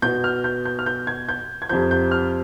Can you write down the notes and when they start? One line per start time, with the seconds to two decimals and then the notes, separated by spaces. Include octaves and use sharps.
0.02 B2 B3 G6
0.24 F6
0.44 G6
0.65 G6
0.79 F6
0.86 G6
1.07 G#6
1.29 G6
1.62 G#6
1.69 F2 C3 F3 G6
1.91 G6
2.11 F6